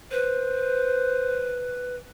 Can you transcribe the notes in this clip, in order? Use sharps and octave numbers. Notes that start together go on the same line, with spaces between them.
B4 C5